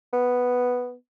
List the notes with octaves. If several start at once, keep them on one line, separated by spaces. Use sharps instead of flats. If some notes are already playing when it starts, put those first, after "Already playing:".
B3